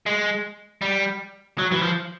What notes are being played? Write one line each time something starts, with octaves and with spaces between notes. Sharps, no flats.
G#3
G3
F#3
E3
F3